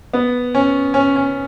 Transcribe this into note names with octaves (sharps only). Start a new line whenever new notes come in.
B3
C#4
C#4
C#4